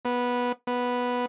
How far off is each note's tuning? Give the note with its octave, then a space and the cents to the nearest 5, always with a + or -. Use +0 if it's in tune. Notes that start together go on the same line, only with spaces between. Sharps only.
B3 -10
B3 -5